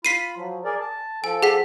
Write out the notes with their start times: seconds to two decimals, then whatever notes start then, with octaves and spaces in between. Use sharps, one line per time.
0.05 F4 B5 B6 C7 D#7
0.37 F3 F#3
0.65 G#4 A#4 D5
0.81 A5
1.24 F3 A4 G#5
1.43 G#4 F#5 B6